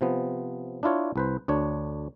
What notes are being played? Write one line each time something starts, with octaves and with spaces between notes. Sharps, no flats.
C3 F3 B3
D4 E4 F4 C#5
C2 B4 C5
D2 D4 C#5